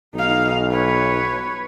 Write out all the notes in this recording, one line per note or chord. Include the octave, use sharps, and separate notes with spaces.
B1 D#4 F5
B4 C#5